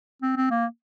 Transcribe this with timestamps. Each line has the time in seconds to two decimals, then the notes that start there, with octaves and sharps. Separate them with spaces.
0.22 C4
0.37 C4
0.51 A#3